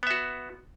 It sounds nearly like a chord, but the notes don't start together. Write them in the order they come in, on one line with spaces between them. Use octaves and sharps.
B3 E5 F#4